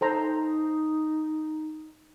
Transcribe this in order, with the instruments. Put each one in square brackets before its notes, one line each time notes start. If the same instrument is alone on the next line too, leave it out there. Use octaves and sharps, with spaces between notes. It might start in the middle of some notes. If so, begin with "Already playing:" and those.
[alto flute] D#4 [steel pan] A4 C5 A#5